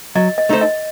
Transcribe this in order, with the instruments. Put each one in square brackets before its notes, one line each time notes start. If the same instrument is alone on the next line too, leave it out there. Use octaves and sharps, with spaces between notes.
[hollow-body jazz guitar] F#3 [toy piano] D#5
[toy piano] D#5
[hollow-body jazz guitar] A3 D#4 A4 C5
[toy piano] D#5